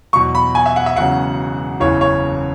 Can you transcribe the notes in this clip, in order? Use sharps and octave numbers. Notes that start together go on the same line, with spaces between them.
E2 B2 F#3 C#6
B5
G#5
E5
F#5
E5
E1 E2 C#3 F#3 F#5
F#1 E2 C#3 E3 C#5
C#5